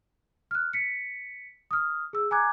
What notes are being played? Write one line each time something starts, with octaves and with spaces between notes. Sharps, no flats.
F6 F#6
B6 C#7
D#6 F6
G#4 E6
G#5 A#5 D6 F#6 G#6